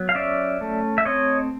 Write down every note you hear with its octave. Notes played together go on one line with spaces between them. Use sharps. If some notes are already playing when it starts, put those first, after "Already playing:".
Already playing: F#3 B3
F5
C#4 D5 E5
A3
E5
C4 C#5 D#5